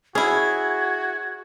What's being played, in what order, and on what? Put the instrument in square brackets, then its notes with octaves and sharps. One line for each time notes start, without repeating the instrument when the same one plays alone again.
[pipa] C#4 E4 [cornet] F#4 [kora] G#4 [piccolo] G#6